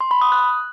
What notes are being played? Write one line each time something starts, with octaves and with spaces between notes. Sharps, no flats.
C6
B5
D#6
F#6